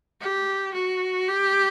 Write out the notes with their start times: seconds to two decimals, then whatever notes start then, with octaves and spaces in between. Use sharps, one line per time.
0.21 G4
0.74 F#4
1.29 G4